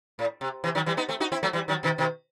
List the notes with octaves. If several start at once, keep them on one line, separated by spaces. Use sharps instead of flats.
A2
C3
C3 E3
D#3 F#3
E3 G3
B3 D#4
A3 C4
D#4 F#4
C4 E4
F#3 A3
E3 G3
D#3 F#3
B2 D#3
B2 D#3